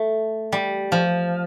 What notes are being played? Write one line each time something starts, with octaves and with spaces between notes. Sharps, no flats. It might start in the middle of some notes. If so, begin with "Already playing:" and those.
Already playing: A3
G3
F3